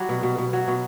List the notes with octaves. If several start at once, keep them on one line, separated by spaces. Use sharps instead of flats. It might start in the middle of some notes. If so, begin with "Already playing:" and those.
Already playing: F#3 G3
B2
B2
B2
F#3
B2